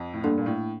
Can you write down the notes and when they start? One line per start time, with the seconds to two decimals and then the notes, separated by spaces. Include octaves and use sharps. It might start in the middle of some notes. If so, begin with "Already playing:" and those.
Already playing: F2
0.14 A2
0.24 G2 A#3 D4 A4
0.38 A#2
0.46 A2